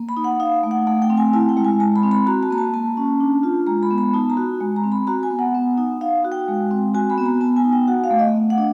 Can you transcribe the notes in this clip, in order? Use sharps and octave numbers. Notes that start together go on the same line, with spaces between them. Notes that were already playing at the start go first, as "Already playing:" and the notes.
Already playing: A#3
B5
D#4
F#5
D#4 F5
A3
F#5
A3 F#5
G5
C4
G#5
E4 A5
G5
G#3
G#5
G#3 A5
B5
C4
B5
F#4 A#5
A5
A#3 A#5
A5
A#3 A5
C#4
D4
F4
G#3 A#5
B5
B3
B5
D#4 A5
A#5
F#4
G#3
A#5
C4
B5
F#4 A#5
G#5
B3
F#5
B3
D#4
D#4 F5
F#4
G5
G#3
C4
F#4 G#5
B5
B3
A#5
B3 A5
G#5
D#4
G5
F#4 F#5
F5
A3
D#5
A3
F#5
D4